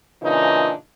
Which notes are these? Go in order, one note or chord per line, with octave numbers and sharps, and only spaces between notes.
A#2 C#3 E3 D4 D#4